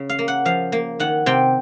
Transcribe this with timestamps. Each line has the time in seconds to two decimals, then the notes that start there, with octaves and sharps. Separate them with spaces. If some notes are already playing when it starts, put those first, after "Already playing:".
Already playing: C#3
0.09 F5
0.19 A#3
0.28 F#5
0.45 F3 F5
0.72 A#3
1.00 D#3 F#5
1.26 C3 G5